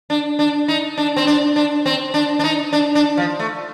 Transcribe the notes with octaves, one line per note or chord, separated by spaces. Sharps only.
D4
D4
D#4
D4
C4
D4
D4
C4
D4
D4
D#4
D4
D4
F3
A3